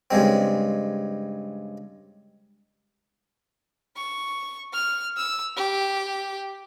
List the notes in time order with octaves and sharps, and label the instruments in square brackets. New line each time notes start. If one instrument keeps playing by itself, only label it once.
[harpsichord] G2 C#3 G#3 C4
[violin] C#6
F6
E6
G4